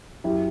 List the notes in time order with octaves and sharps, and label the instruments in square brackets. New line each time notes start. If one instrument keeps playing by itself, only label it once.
[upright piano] F#2 F#3 E4 G4